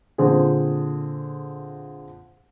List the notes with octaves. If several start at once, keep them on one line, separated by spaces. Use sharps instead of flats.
A#2 D3 C4 G#4